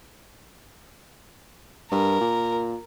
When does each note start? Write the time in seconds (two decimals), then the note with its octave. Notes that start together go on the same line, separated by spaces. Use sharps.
1.91 G2 A#4
2.21 A#2